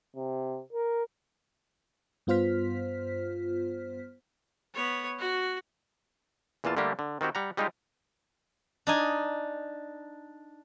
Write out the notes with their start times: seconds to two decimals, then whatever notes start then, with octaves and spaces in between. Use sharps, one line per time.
0.16 C3
0.73 A#4
2.27 G2 B3 F4 C5 F6 B6
4.74 B3 C#5
5.19 F#4
6.64 E2 A#2 E3 F4 A5
6.77 D3 G3 A3 A#3 D4 G4
6.99 D3
7.21 D#3 C4 F#4 G4
7.35 G3 F#5 A#5
7.57 G3 G#3 D#4 F4 G4
8.87 D4 D#4 G#5